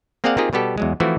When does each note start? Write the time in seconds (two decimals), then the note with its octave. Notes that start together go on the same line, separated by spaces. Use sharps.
0.24 A#3 C4 G#4 D5 F5 F#5
0.37 A#3 C4 D#4 F4 G4 G#4
0.53 B2 G3 B3 G4 A4
0.78 E2 F#3 G#3
1.00 E3 F3 A3 C4 E4 F#4